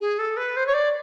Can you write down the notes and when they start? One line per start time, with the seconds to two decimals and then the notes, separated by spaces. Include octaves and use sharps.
0.01 G#4
0.19 A4
0.37 B4
0.56 C5
0.66 C#5
0.74 D5